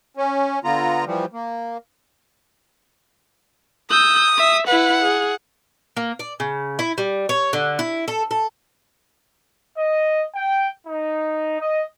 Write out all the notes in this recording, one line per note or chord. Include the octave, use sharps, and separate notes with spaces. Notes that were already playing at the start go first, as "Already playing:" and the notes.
C#4
D3 B3 F4 A#5
E3 F3 G3
A#3
D#6 E6 G6
E5
E4 B4 F#5
G#4
A#3
D5
C#3
E4
G3
C#5
D3
E4
A4
A4
D#5
G5
D#4
D#5